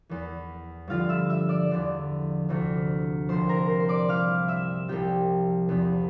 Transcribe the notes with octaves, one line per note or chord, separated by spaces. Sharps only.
E2 E3
G2 D3 F3 F4 F5
E5 E6
E5 E6
D5 D6
E2 D3 F3
D2 C3 E3
C2 C3 F3 C5 C6
A#4 A#5
C5 C6
C6
D5 D6
G2 E3 F5 F6
E5 E6
C2 C3 F3 G4 G5
E2 C3 F3